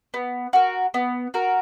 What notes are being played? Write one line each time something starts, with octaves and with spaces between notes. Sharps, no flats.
B3
F#4 A#4
B3
F#4 A#4